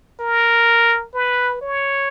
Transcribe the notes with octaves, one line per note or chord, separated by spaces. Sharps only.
A#4
B4
C#5